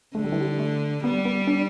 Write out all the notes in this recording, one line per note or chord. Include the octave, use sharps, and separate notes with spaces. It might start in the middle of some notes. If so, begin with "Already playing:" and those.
D3 A3
G3
E3
G3
A3
G3 B3
B3
D4